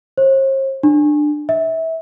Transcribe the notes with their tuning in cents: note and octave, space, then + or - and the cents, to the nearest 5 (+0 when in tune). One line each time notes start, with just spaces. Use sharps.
C5 +45
D4 +20
E5 -25